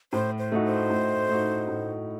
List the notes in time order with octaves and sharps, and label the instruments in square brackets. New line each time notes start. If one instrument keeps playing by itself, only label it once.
[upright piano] A2 [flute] C5
[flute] C5
[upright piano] A3 D#4 F#4
[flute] C5
[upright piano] A2
A3 D#4 F#4
A2